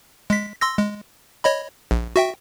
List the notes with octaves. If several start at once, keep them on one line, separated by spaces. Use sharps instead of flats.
G#3 B6
C6 E6 A#6
G#3
C#5 D#5 B5
A#1
F#4 E5 G5